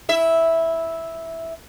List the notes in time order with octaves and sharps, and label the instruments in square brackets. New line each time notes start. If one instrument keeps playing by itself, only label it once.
[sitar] E4 E5